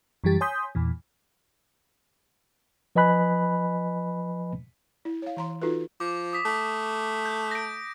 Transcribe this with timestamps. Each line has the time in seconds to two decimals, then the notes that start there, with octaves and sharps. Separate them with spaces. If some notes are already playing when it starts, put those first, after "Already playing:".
0.24 F#2 E3 G3 G4 A6
0.41 C#5 G#5 C6 D#6 G6 B6
0.75 E2 A#2 E3
2.96 F3 B4 D#5 G#5 B5 F#6
5.05 E4
5.22 C#5 F5
5.37 E3 A#5 C6
5.62 D#4 F4 F#4 A4 B4
6.00 F3 D6
6.33 D#6 B6
6.45 A3
7.25 G6
7.51 A#6 D7